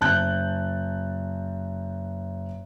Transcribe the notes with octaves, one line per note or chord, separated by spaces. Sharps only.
F#1 A5 F#6 G6